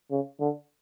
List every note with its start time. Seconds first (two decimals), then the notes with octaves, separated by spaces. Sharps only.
0.11 C#3
0.40 D3